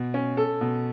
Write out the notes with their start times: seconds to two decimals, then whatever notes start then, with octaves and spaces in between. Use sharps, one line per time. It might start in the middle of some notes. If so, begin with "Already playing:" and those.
Already playing: B2
0.14 C#4
0.37 A4
0.61 B2